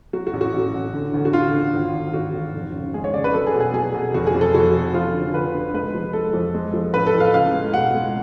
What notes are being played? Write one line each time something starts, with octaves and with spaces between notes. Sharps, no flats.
F#3 F#4
F#4
A1
F#4
A1
A1
D3
D2
F#4
D3 F4
D2
G#1
G#1
G#1 F#4
G#1
F1
C#3
G#3 G#4
C#5
C#3 D5
B4
F#3 A4
G#4
B2
G#4
F#3 G#4
B2
F1 F#4
G#4
F2
A4
F1 F#4
F1
F3 F4
D3
D2 B4
D3
G#3 B4
F3
G#3 A4
F2
G#3
F3
A1 B4
A4
A2
F5
C#2 F5
G#3
B2 F#5
G#3